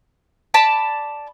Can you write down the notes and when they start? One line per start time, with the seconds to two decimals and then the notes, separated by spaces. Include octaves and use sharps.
0.54 D5 A5 B5